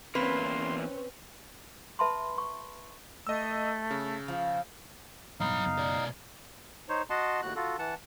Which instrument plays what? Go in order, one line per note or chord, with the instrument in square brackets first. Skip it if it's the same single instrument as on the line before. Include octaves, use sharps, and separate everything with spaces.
[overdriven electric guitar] E2 A#3 [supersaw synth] C4 C#4 [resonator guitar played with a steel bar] B4 [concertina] C6
[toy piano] B4 E5 A5 B5 C6
C#6
[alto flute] A3 [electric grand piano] D#5 E6
[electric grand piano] C#3
[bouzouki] F3
[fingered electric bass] A1 G2 B2 [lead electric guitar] F#3 B5 [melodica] D#4 F5
[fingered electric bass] F#2 C#3 B3
[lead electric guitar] B2 D5
[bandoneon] D#4 C5 C#5
F#4 D#5 F#5 A5 C6
D#2 A2 F#4 F#6
F4 F#4 A4
E3 F#5 A5